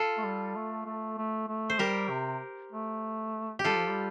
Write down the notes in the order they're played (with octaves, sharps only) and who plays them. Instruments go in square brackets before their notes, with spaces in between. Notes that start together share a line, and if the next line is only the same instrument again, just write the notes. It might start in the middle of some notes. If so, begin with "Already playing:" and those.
Already playing: [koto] F4 A4
[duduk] A3
G3
A3
A3
A3
A3
[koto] C5
[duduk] G3 [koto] G4 A#4
[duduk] C3
A3
[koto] G4
[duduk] G3 [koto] F4 A4
[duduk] F3
G3